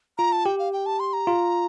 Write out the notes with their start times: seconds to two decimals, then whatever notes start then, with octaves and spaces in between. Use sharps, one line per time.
0.18 F4 A#5
0.32 A5
0.46 G4 G5
0.59 F5
0.73 G5
0.86 A5
1.00 C6
1.13 A#5
1.27 F4